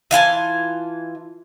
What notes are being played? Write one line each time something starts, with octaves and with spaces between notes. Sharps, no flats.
E3 F4 G#5 A5